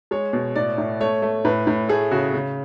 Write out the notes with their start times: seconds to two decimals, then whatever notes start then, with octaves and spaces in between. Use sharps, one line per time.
0.11 G#3 C#5
0.33 B2
0.56 A2 D5
0.78 A2
1.00 A3 C#5
1.22 A3
1.45 A2 B4
1.67 A2
1.89 A3 G#4
2.11 C#3 F#4
2.34 C#3